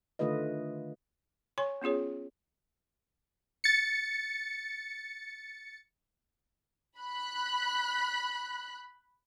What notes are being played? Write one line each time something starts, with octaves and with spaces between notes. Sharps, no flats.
D3 D#3 A3 F4 B4 D#5
C#5 G#5 C6 C#6
B3 C#4 F4 G#4 C#5
A6 C#7
B5 F#6